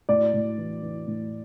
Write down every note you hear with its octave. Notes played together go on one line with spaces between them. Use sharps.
A2 D5
A2
E3
E3
A2